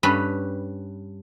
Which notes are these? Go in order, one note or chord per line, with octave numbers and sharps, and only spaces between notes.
G2 G3 C#4 B4 B5